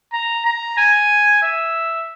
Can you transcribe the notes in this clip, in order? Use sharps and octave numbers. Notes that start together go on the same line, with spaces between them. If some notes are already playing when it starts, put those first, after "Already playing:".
A#5
A#5
G#5
E5